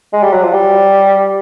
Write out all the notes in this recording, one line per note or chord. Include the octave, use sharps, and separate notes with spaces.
G#3
G3
F#3
F3
G3